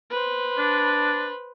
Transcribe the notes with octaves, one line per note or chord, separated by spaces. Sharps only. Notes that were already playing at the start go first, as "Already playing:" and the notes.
B4 C5
D4